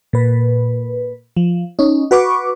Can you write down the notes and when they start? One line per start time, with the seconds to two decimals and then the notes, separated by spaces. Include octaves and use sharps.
0.13 A#2 B4
1.37 F3
1.79 C#4 D#4
2.11 F#4 B4 C#6 D6